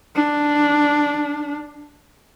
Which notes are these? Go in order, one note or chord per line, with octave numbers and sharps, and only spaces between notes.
D4